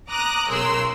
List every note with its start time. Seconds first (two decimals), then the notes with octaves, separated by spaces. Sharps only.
0.10 A#5 D6 D#6 F#6
0.49 B1 C#3 A#4 C6 E6